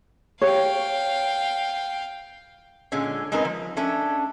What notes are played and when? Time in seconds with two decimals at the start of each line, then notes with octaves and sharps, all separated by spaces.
0.41 G4 C#5 F5 G5
2.92 A#2 D3 G#3 C#4
3.32 G#3 C4 D#4 G#4 A#4 B4
3.45 F3
3.77 A3 C#4 D4